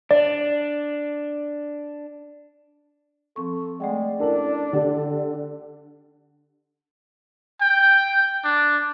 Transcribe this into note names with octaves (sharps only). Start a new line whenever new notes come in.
D4 D5
F3 C4 A4 C#6
G#3 A3 D5 F#5 G5
C#4 D4 E4 A4 A#4
D3 G4
G5
D4